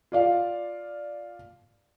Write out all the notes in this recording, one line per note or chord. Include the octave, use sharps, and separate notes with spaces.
F4 D5 F5